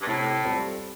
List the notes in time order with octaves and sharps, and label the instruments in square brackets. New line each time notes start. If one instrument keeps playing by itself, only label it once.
[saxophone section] G2
[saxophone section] A2 [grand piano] C3
[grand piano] G3 C4 F4 A4